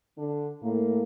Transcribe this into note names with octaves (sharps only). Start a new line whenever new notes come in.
D3 D4
A2 A#3